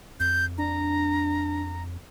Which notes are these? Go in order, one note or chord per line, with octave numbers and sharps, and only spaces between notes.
F2 G6
D4 A#5